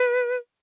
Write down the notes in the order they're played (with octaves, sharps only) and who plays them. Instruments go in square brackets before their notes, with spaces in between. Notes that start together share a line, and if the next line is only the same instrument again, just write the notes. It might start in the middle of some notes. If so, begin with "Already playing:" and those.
Already playing: [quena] B4